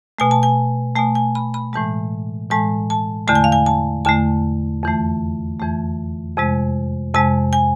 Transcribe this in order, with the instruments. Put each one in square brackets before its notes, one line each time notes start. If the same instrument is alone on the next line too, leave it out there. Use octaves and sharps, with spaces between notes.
[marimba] B2 A3 G#5
A5
G#5
A3 G#5
B2
G#5
B5
B5
A2 E3 G#3 A5
A2 E3 G#3 A5
A5
E2 D3 A3 A5
G#5
F5
G#5
A5
E2 D3 A3 A5
F2 E3 A3
F2 E3 A3
F2 C3 G#3
F2 C3 G#3 A5
G#5